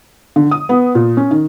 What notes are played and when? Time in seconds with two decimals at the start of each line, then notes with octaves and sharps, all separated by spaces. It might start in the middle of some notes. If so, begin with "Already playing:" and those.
0.36 D3
0.51 D#6
0.69 B3
0.95 A#2
1.17 C#4
1.31 D#3